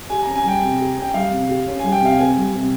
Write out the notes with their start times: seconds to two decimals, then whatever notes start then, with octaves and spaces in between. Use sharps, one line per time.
0.10 G4 G#5
0.23 C#4 A#5
0.36 G#5
0.44 G3 G5
0.62 C3
0.79 G4
0.97 C#4
1.02 G5
1.14 G3 F5
1.31 C3
1.49 G4
1.66 C#4
1.79 G3 G#5
1.92 G5
2.01 C3 F5
2.19 C4 G#5
2.36 G3
2.54 C3